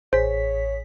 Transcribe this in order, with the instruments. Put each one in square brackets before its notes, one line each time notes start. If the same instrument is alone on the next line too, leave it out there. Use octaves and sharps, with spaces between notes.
[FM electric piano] A1 G#4 B6 [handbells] C5 [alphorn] C#5